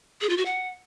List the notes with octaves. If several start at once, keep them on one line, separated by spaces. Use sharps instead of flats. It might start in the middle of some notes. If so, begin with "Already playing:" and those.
G#4
F4
F#4
F#5